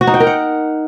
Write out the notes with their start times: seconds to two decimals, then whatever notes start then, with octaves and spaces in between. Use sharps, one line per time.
0.01 F#4
0.07 D#4
0.14 G5
0.20 A#4
0.27 F#5